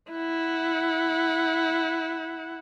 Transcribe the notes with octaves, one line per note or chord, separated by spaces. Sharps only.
E4 F#5